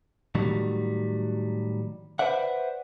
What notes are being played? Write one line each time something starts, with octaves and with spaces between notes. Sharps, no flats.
A2 D#3 F#3 G3
B4 C5 D5 E5 F#5